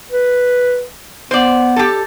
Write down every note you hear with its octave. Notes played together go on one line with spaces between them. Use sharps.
B4
B3 C5 D5
G4 A4